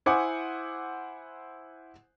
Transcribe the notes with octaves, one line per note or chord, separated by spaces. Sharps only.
E4 C5 F#5 G#5 D6 D#6